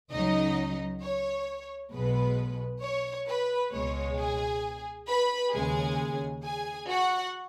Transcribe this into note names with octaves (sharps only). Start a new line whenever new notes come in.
C#2 C#3 F#3 D#4 D#5
C#5
B1 B2 G#3 B4
C#5
B4
C#2 B2 G#3 C#5
G#4 G#5
B4 B5
D#2 C#3 G#3 G#4 G#5
G#4 G#5
F#4 F#5